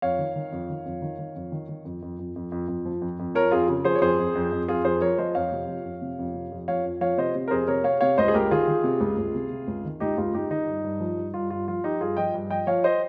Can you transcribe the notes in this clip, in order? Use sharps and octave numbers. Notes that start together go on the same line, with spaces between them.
F2 C#5 F5
D#3
D#3
F2
D#3
F2
D#3
D#3
F2
D#3
D#3
F2
F2
F2
F2
F2
F2
F3
F2
F2
F3 A#4 C#5
F2 F4 G#4
C#3
F3 G#4 C5
C#5
F2 G#4 C5
F2
F2
F2
F2 F4 G#4
F2 G#4 C5
F3 A#4 C#5
F3 C5 D#5
F2 C#5 F5
C3
F3
F2
C3
F2
C3
F2
F3 C#5 F5
F2
F3 C#5 F5
C3 C5 D#5
C3
A#4
F2 G#4 C5
C3 A#4 C#5
C3 C#5 F5
C3 C#5 F5
C#2 C5 D#5
G#4
C#2 G4 A#4
D#3 F4 G#4
D#3
C3
C#2
C#2
C3
C3
C#2
D#3
C#2 D#4 G4
C#2 F4
C#2 D#4 G4
D#3 D#4
G2
G2
F3
G2
G2 F4
G2 F4
F3 F4
F3 D#4 G4
G2 F4 G#4
F3 D#5 G5
G2
F3 D#5 G5
F3 C#5 F5
C5 D#5